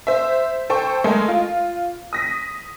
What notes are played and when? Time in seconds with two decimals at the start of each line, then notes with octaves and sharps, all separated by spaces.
0.07 C5 E5
0.70 A4 C5 G5 C#6
1.04 G#3 A3 A4 A#4
1.28 F4
2.13 D#6 A#6 B6